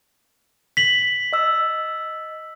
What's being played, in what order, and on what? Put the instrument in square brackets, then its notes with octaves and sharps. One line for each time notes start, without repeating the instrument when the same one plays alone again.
[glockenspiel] B6 F#7
[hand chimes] D#5 E6